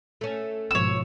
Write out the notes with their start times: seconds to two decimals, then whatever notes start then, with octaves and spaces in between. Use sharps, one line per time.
0.21 A3 C#4
0.71 G#1 B2 F3 C#5 E6